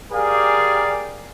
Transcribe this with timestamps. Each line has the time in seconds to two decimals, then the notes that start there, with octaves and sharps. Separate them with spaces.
0.12 G4 G#4 A#4 D5 F5